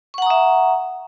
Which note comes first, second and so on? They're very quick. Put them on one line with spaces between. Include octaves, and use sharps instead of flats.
C#6 F#5 A#5 D#6 E5